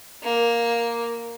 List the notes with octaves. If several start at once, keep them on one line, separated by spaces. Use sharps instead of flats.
A#3